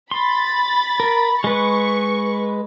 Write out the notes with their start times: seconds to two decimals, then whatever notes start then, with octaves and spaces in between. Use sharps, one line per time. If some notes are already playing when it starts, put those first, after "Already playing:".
0.11 B5 C6 A6
1.00 A#4
1.44 G#3 B4 C#6